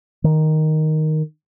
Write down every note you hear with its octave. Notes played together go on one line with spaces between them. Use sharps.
D#3